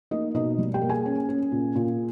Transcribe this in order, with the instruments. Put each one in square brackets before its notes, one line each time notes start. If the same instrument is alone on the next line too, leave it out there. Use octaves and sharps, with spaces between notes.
[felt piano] A#3 D#4 D#5
B2 D#4 D#5
G3
G4 G5
A#3
G#4 G#5
C#4
C#4
A#2
A#2